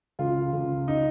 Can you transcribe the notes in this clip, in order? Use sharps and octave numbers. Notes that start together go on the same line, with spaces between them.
C#2 F4
C#2
D#4